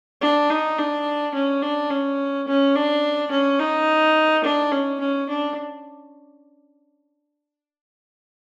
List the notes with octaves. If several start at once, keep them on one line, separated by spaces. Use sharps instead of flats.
D4
D#4
D4
C#4
D4
C#4
C#4
D4
C#4
D#4
D4
C#4
C#4
D4